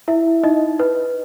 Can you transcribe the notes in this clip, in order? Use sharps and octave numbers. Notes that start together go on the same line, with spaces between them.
E4 E5
D#4 D#5
B4